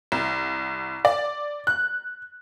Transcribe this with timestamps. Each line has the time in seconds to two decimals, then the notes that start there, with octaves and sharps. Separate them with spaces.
0.12 C2
1.05 D5
1.67 F#6